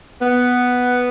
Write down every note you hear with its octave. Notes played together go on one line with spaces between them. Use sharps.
B3